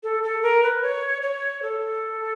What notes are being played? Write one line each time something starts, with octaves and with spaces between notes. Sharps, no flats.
A4
A4
A#4
B4
C#5
C#5
A4